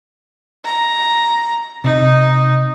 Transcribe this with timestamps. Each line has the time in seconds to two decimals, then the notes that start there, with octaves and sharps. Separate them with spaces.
0.65 A#5
1.84 C3 D#4